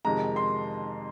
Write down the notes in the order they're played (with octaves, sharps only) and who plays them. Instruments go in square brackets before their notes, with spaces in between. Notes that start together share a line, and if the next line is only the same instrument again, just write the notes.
[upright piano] F2 C3 D#3 G#3 A#5
C6